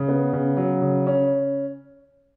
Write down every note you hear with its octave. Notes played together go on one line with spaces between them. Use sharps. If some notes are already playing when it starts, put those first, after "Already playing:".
Already playing: C#3
B3
C#3
F#3
C#3
C#4